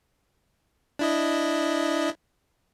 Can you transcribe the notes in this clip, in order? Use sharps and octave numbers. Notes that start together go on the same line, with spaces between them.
D4 E4 D#5